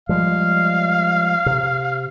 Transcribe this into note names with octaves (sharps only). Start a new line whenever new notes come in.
F3 G3 G#3 F5
C3